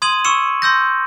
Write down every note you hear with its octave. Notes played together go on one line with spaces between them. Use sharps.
C6 D#6 G#6 D#7 F#7
C#6 E6 C#7 E7
C6 E6 G6 A#6